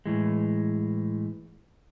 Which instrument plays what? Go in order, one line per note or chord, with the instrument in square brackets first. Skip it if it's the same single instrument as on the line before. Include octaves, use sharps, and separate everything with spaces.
[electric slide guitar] A2 E3 G#3